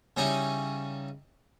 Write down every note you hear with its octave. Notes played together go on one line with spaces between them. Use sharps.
C#3 G3 C#4 D#4 E4